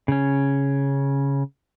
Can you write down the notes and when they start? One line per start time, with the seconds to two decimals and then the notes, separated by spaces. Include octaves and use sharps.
0.08 C#3 C#4